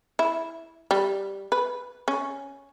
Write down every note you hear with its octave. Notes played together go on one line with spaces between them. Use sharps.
E4
G3
B4
C#4